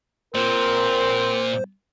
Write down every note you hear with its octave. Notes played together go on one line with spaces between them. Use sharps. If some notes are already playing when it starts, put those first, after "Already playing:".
A#2 C4 A#4 C5